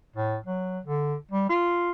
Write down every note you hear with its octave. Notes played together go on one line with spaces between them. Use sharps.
A2
F#3
D3
G3
F4